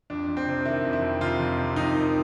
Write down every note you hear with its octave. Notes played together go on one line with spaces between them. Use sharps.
F2 D4
F2
C4
C3
D#3 E4
F2
E4
F2
C3 F4
F2
C3
F2 D#4
D#3